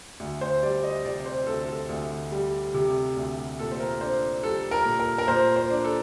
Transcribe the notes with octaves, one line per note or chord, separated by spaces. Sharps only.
D2
C5
G3 D5
D#5
C3 D5
C5
D2 A4
A4
D2
G3
C3
D2
A#2 A4
C5
A#4
D4 C5
G3 A4
A#4
A#2
A#4
A#4
A#2 C5
C5
D4
A4